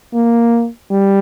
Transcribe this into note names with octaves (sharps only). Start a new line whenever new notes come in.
A#3
G3